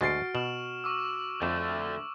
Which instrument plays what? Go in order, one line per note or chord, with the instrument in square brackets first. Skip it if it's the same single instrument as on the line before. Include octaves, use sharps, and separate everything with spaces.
[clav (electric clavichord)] D2 G#3 [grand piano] F#4 A6 C7 [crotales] C#6 F6 D7
[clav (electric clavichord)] B2 [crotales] E7 F#7
[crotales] C#6 D6 E6
[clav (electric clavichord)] F2 [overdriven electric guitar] D3 A3